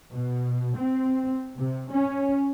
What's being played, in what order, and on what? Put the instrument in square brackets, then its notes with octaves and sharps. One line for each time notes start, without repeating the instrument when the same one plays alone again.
[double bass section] B2
C4
C3
C#4